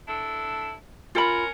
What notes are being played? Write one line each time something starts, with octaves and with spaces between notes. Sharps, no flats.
D4 E4 A4
C#4 F4 A#4 B5